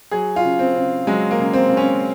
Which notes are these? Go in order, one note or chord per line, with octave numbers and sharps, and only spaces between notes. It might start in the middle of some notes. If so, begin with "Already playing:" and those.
F#3 G#4
F4
C#3
C4
C#3
F#3 G#3
A#3
C#3
C4
C#3
C#4